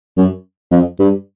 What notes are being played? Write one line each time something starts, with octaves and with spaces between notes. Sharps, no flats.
F#2
F2
G2